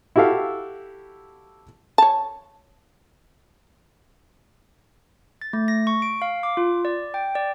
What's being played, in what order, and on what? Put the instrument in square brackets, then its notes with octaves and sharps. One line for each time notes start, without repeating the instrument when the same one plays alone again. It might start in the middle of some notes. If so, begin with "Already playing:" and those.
[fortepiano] E4 F#4 G4 A4 F5
[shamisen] C#5 A5
[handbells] A6
A3
A#6
C#6
D7
F5
D6
F4
D5
G5
D5